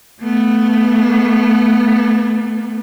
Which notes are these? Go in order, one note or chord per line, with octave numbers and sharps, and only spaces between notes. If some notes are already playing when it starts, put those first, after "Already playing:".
A3 B3